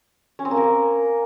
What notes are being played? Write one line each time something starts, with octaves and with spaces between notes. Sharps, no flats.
C#4
C4
A#3
A#4
C#4